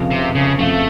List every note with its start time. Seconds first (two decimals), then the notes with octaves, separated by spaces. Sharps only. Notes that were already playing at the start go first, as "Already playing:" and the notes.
Already playing: F1 F2 C#3 F3
0.11 C3
0.35 C#3
0.59 F1 F2 C#3 F3 A3